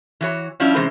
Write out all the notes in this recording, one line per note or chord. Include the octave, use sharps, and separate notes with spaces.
E3 F#4 C#5
F3 G3 C#4 D4 E4 F4
C3 E3 G#3 C#4 A#4 C5